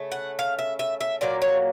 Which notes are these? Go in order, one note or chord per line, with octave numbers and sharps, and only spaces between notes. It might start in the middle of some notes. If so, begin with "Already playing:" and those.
Already playing: C#3 A3
F#5
F5
E5
E5
E5
A#2 F#3 A#3 D5
C#5